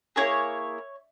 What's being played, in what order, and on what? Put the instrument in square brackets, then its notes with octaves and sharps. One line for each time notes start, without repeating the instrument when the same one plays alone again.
[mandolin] A#3 C#4 E4 G#4 C#5